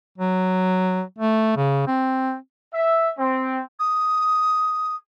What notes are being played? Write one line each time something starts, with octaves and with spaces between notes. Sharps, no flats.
F#3
A3
C#3
C4
E5
C4
D#6